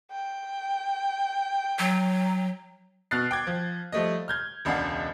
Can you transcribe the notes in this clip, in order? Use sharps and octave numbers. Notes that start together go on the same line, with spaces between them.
G5
F#3
B2 F6 F#6 A6 C7
G5 D6 G#6
F3
F3 G3 A3 D#5
F6 G6 G#6
E1 C#2 D4 G#4 F5 F#5